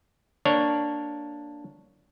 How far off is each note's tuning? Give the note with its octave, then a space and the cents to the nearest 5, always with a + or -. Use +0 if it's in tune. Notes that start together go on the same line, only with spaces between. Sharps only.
A#3 +0 D4 +0 C#5 +0